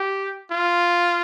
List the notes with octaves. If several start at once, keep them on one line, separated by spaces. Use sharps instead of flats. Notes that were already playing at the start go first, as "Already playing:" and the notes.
Already playing: G4
F4